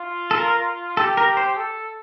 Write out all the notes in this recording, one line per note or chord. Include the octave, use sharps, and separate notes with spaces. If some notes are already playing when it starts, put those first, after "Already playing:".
Already playing: F4
A4
A#4
G4 A4
A#4
C5
A4